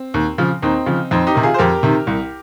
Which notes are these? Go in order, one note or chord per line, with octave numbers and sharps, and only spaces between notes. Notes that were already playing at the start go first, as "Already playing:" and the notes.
Already playing: C4
D#2
C#3 F3
D#2 C4 D#4
C#3 F3
F2 C4 D#4
D#4 G4
C3 D#3
F4 G#4
C5
F2 G4 A#4
C3 D#3
C2